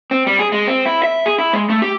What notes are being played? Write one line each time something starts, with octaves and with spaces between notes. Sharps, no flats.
C4
G3
G#4
G#3
C4
E4
E5
G#4
E4
G#3
A3
G4